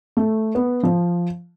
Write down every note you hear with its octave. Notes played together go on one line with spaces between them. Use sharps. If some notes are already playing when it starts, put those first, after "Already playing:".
A3
B3
F3